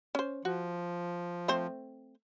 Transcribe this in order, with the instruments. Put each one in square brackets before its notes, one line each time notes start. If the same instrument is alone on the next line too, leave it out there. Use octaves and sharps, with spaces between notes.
[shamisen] C#4 C5
[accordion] F3 [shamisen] F#4
[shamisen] A3 C4 C5